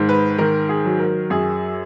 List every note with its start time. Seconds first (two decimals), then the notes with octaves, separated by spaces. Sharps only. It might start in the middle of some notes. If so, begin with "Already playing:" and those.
Already playing: G#2 D#3
0.09 B4
0.38 D#3 A#4
0.69 G#4
0.85 F#3
1.00 A#4
1.30 F#2 G#4